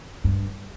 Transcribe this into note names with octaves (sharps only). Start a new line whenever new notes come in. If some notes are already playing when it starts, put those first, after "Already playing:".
G2